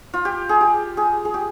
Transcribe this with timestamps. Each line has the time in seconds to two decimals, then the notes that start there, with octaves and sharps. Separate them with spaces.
0.14 F4
0.25 G4
0.49 G#4
0.61 G4
0.97 G#4
1.25 G#4
1.34 G4